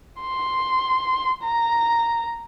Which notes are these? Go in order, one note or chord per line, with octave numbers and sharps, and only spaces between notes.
C6
A#5